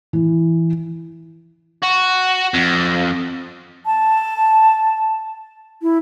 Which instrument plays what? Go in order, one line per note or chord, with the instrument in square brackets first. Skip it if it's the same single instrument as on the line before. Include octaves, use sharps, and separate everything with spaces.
[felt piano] E3
[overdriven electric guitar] F#4
F2
[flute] A5
E4